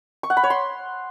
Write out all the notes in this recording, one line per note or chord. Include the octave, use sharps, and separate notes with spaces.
C#6
F#5
B5
C#5
C6